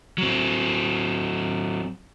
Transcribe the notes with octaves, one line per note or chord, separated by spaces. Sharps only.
F#3 C4